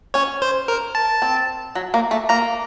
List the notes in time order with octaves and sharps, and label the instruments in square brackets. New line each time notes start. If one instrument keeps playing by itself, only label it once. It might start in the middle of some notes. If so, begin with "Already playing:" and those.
[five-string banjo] C#4 [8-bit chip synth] C#5
[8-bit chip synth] C5
A#4
A5
[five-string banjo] C4
F#3
A#3
A3
[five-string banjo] A#3 [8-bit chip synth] A#5